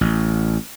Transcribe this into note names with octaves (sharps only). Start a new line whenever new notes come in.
A1